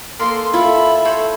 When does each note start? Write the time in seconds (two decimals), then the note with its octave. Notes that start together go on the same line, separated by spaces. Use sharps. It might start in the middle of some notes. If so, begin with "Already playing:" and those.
0.19 A#3 A4 A#4 C6
0.53 E4 F4 A4 E5 B5
1.05 A4 C5 C#5